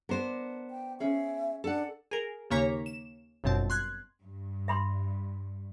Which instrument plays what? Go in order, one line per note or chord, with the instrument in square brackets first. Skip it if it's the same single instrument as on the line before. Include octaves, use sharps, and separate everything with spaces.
[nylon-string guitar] B3 C5 [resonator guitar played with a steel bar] D4 A#4
[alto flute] G5
[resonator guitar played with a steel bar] C#4 G#4 [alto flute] E5
[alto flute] D4 [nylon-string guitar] A4 F#5
[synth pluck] G#4 A#4
D#2 C#3 A#3 C#5 A#5 B6
E7
G1 F#2 B2 C4 A5
C6 F#6 G#6
[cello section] G2
[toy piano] E5 B5 C6